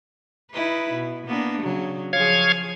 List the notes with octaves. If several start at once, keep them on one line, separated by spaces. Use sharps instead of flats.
D#4 E4 B4
B2
A#3 B3 D4
C#3 F#3
F3 G#4 C#5 F5 G#6